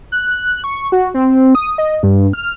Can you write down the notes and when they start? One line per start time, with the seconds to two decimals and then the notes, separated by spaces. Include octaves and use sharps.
0.12 F#6
0.64 C#6
0.92 F#4
1.14 C4
1.55 D#6
1.78 D#5
2.03 G2
2.33 F6